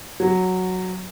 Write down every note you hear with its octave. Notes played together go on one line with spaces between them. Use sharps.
F#3